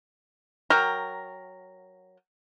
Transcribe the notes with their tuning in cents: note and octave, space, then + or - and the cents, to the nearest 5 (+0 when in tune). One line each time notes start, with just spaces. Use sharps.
F#3 +0 A#4 +0 G5 +10